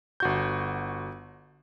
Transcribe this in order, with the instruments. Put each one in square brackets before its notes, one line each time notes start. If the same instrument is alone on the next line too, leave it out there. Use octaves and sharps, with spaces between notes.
[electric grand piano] G1 F#4 G6